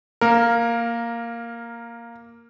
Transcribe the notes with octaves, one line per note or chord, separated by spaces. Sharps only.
A#3 A#4